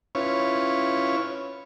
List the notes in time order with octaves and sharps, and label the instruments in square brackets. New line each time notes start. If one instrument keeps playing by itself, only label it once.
[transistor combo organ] C#4 E4 F4 B4 C#5